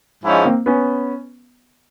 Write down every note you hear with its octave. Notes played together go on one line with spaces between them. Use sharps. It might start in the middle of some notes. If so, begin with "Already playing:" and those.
G#2 F3 G#3 C#4 E4
A#3 C4
B3 C#4